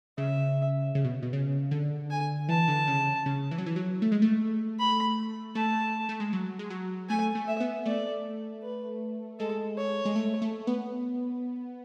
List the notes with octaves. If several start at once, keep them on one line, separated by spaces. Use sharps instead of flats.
C#3 E5
C#3
B2
B2
C#3
D3
G#5
E3 A5
D3
C#3
C#3
E3
F#3
E3
F#3
A3
G#3
A3
B5
A3 A5
A3
G#3
F#3
G#3
F#3
A3 G#5
A3
E5
B3
A3 D5
B4
G#3 A4
C#5
G#3
A3
A3
B3